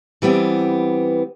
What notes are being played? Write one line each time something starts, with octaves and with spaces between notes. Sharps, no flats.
E3 G3 B3 C4